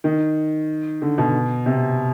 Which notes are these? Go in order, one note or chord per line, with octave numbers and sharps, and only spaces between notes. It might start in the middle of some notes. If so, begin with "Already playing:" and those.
D#3
D3
B2
C3